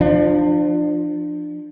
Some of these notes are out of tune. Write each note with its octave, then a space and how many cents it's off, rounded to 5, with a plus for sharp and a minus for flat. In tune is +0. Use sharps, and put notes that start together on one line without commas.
F3 +0 D4 +30